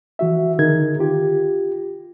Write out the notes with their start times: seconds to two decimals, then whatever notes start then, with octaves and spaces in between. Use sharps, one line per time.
0.19 E3 F#4 E5
0.59 D3 D#3 D#4 G#4 A#4 G#6
1.00 F4 G4